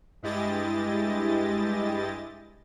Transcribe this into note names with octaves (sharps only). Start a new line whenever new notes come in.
G2 G#3 E4 G4 D#5 A6